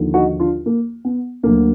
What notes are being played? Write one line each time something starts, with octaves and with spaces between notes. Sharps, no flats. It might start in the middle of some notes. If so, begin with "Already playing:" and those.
Already playing: D#2 D3 F3
D#4 F#4
D4 F4
A#3
B3
D2 D3 F#3 A#3